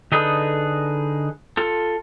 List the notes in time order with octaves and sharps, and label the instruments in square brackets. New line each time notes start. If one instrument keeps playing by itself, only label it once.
[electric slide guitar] D3 D#4 G#4 A4 B4
F4 A4